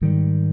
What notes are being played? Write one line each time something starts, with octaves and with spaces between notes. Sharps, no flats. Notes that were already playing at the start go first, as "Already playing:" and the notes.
G#2 D#3 G3